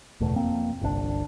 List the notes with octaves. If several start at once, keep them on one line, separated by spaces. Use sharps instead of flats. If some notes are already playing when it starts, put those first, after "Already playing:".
F#1 E2 B2 A3
F2 A#3 C4
G1 C2 C#3 D4